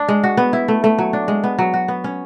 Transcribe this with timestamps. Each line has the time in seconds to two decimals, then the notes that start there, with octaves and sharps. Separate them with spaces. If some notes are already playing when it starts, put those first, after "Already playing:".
Already playing: D4
0.08 G#3
0.24 F#4
0.37 B3
0.53 E4
0.68 A3
0.84 A3
0.99 F#3
1.13 D4
1.28 G#3
1.44 B3
1.59 F#3
1.74 F#4
1.88 B3
2.04 C#4